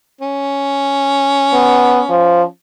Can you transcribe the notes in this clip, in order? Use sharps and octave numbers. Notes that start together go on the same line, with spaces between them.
C#4
B3
F3